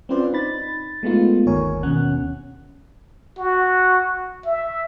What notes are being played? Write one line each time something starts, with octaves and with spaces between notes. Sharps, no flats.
C4 C#4 F4 B4 C5 D5
D#4 B5 A6
G#3 A3 B3 D#4 F4
G1 D#2 A#4 C#5 G#5
D#2 B2 C#4 F#5 F#6
F#4
E5